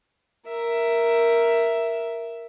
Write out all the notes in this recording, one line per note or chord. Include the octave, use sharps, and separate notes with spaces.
A#4 E5